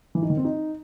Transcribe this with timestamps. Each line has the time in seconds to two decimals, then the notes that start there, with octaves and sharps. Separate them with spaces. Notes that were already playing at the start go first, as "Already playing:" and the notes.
0.15 E3
0.22 D#4
0.30 D#3
0.37 C4
0.45 D#4